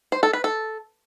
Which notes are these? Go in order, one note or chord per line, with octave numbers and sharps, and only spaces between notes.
C5
A4
B4
A4